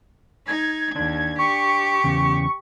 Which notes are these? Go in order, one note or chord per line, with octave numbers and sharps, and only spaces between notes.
D#4 G#6
D#2 D4
G4 C#6
E2 C#3